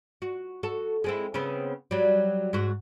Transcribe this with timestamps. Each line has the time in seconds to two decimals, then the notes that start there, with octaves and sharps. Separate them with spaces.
0.22 F#4
0.63 F#4 A4
1.04 G#3 C4 E4
1.34 C#3 B3 C4
1.91 F#3 G3
2.53 G#2 F#4